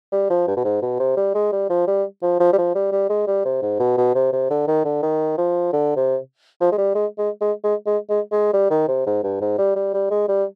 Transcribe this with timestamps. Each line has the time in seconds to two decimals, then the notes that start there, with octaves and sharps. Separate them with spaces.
0.12 G3
0.30 F3
0.47 G2
0.57 B2
0.65 G#2
0.82 B2
1.00 C3
1.17 G3
1.35 G#3
1.53 G3
1.70 F3
1.88 G3
2.22 F3
2.40 F3
2.53 G3
2.58 F3
2.75 G3
2.92 G3
3.10 G#3
3.27 G3
3.45 C3
3.62 G#2
3.80 B2
3.98 B2
4.15 C3
4.33 C3
4.51 D3
4.68 D#3
4.85 D3
5.03 D#3
5.38 F3
5.73 D3
5.96 C3
6.61 F3
6.72 G#3
6.78 G3
6.95 G#3
7.19 G#3
7.41 G#3
7.64 G#3
7.86 G#3
8.09 G#3
8.32 G#3
8.54 G3
8.71 D#3
8.88 C3
9.07 G#2
9.24 G2
9.41 G#2
9.58 G3
9.76 G3
9.94 G3
10.11 G#3
10.29 G3